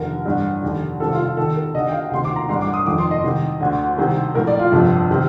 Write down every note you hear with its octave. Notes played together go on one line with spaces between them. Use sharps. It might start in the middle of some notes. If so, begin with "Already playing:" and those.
Already playing: F1 D#2 D3 A#4
A1 G2 D3
F1 D#2 D3
C2 C3 D#3 A4
F4
F4
D#2 D#3 A4
A#4
D#2 D3 D#5
G5
F5
D2 C3 D#3 C6
D6
A#5
A1 G2 D3 C6
D6
D#6
F1 F2 D#3 D6
C6
D#5
C2 C3 D#3
D2 D3
C2 C3 D#3
A#1 A2 A#4
D5
F4
G1 F2 C3
C3 D#3